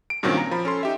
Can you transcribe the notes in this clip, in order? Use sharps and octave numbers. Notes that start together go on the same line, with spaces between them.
D7
G2 A#2 D#3 F#3 C4 C#4
A#5
F3 B5
C#4 A4 C6
D#4 G4 E5